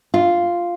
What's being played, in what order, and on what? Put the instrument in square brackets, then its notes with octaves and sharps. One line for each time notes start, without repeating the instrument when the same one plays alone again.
[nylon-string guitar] F4